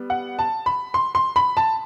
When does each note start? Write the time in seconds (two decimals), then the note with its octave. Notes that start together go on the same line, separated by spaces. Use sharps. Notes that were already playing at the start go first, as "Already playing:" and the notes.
Already playing: G3 B3
0.10 F#5
0.39 A5
0.66 B5
0.94 C6
1.15 C6
1.36 B5
1.57 A5